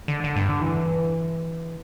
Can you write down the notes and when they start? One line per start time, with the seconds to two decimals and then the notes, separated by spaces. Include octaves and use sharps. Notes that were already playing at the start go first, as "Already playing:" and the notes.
0.08 D3
0.24 D3
0.36 G2
0.49 D3
0.61 E3